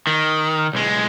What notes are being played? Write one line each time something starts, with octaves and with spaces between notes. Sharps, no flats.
D#3
B1 G#3